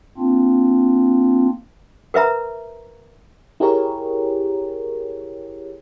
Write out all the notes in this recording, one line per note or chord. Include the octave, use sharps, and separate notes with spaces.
A#3 C4 D4 F4
A#4 B4 E5 A#5
E4 G4 G#4 A#4 C#5